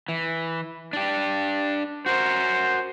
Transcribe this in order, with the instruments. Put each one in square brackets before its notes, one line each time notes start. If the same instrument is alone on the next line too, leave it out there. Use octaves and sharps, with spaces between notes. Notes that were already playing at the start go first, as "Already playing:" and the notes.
[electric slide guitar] E3
D4 G4
[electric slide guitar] F#4 A#4 [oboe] C5